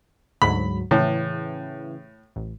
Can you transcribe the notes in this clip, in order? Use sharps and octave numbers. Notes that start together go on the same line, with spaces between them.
D2 G#2 F#3 B5
A2 C#3 E3
A1